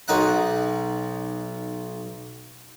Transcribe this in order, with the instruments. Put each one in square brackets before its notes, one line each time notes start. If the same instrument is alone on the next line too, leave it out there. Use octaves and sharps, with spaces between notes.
[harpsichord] B1 D#4 F#5